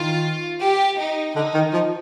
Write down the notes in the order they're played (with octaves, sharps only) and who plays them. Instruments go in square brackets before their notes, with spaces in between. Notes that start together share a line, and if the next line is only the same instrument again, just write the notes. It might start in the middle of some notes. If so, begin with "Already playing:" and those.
Already playing: [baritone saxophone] D#3 [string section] F4
[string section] G4
D#4
[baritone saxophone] D3 [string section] D#4
[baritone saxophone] D#3
F3